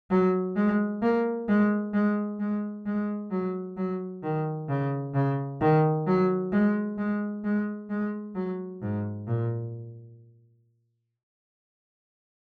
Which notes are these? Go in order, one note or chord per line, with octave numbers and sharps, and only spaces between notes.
F#3
G#3
A#3
G#3
G#3
G#3
G#3
F#3
F#3
D#3
C#3
C#3
D#3
F#3
G#3
G#3
G#3
G#3
F#3
G#2
A#2